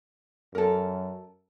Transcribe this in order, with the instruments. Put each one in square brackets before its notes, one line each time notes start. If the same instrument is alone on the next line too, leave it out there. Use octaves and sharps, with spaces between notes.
[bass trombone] F#2 [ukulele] A4 A#4